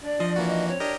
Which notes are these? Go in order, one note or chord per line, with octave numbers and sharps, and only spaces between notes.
D4 D5
F3 D#5
E3 A#3 F#4
D#5
C4 C#5
D4 G4 A#4 D#5